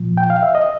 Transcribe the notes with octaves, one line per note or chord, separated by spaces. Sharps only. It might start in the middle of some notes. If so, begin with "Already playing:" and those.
Already playing: A#2 F3
G5
F5
E5
D#5